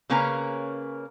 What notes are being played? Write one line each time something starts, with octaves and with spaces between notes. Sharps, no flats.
C#3 A#3 C#4 B4 A#5